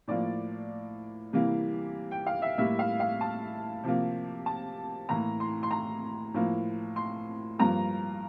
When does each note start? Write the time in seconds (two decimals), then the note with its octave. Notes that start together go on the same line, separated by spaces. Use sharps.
0.08 A2 F3 A#3 D5
1.33 C3 E3 G3 A#3
2.11 G5
2.27 F5
2.42 E5
2.58 A2 G3 A#3 E5
2.79 F5
3.00 F5
3.21 A5
3.84 C3 F3 A#3
4.46 A5
5.09 A2 E3 A#3 A#5
5.40 C6
5.63 C6
5.71 A#5
6.34 A2 F3 A#3
6.96 C6
7.59 G2 F3 A#3 A#5